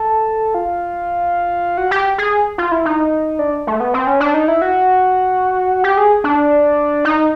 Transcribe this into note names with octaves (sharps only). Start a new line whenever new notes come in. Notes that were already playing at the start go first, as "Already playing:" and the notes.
Already playing: A4
F4
F#4
G4
G#4
F4
E4
D#4
D4
A3
B3
C4
C#4
D4
D#4
E4
F#4
G4
G#4
D4
D#4